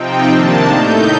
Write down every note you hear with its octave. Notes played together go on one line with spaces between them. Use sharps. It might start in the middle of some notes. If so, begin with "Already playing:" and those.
Already playing: C3 F3 C4 D#4 G5
C3 D#3 A#3 D4 A5
A2 A3 D#4 G6